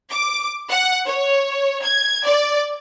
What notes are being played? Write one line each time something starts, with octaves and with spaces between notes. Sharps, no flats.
D6
F#5
C#5
G#6
D5